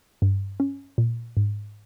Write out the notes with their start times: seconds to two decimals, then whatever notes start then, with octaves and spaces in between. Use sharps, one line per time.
0.22 G2
0.60 C#4
0.98 A#2
1.37 G#2